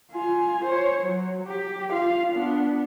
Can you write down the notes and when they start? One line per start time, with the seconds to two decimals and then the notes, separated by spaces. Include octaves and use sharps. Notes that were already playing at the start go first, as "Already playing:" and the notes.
0.11 F4 G#5
0.64 C5 C#5
1.02 F#3
1.47 G4
1.90 F4 F5
2.32 B3 D4